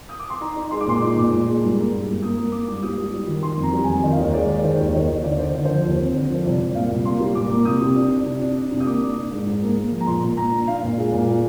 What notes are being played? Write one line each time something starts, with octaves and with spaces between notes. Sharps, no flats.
D#6
D6
C6
D#4 A#5
D#4
G#3 C6
D6
A#2 C6
D#4 D6
A#2
A#2
G#3
G2
A#3
G2
G2
A#3 D#6
A#3
A#3 D6
G2
G3 D#6
G3
G3
D#3
D#3 C6
F2
A#5
G3
F2 G#5
D#3 D#5
F5
D#2 D#5
G#3 D5
D#3
D#3 C5
D#2
D#2 D#5
D#2
D3 D5
D3 C5
D3
C5
F3
D#2
C4
D3
F3 C5
C2 D5
C2
A#2 F5
C2
A#3 C6
G3
A#2 D6
A#3
C3 D#6
C3
D4
D4
C3
D4
D4
C3
D#6
A#3 D6
D4
D4
G#2
G#2
A#3
A#3
F3
A#5
A#2 C6
A#2
A#2 A#5
D4
D4 F5
A#2
G#3
A#2
G#3